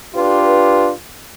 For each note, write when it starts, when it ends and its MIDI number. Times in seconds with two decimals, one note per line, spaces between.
0.15 0.91 62
0.15 0.91 65
0.15 0.91 67
0.15 0.91 71